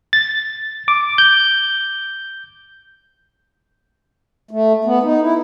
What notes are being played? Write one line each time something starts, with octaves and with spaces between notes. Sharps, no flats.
A6
D6
G6
A3
B3
D#4
E4